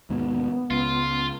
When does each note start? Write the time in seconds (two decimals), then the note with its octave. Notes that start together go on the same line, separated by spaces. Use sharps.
0.10 D#2 G#2 B2 B3
0.71 C#2 F4